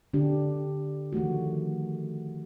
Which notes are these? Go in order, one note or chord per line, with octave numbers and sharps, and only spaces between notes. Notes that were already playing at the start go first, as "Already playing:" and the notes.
D3 D4 G4
D#3 F3 A3 F#4